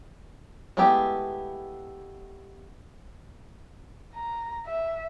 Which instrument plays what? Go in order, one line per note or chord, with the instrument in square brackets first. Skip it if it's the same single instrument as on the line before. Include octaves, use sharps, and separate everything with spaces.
[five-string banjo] G#3 A3 B3 E4 G4
[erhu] A#5
E5